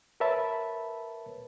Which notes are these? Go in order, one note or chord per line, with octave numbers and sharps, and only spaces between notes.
A#4 B4 C#5 E5 A5 B5